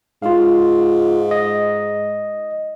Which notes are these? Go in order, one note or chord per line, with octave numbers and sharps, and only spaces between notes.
G#2 F4 F5
D#5